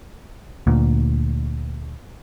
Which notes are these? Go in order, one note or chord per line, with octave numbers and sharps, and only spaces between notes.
D2 A#2